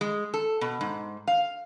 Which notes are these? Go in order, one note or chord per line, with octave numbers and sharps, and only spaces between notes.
G#3
A4
B2
G#2
F5